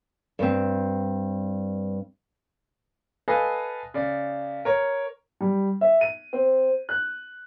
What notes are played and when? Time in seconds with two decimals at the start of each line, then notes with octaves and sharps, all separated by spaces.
0.39 G2 C4
3.28 A4 B4 D#5 F5 G#5
3.94 C#3 D5
4.65 A#4 C#5
5.41 G3
5.81 E5
6.01 D#7
6.33 C4
6.89 F#6